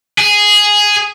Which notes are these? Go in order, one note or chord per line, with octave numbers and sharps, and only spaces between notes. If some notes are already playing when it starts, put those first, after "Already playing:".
G#4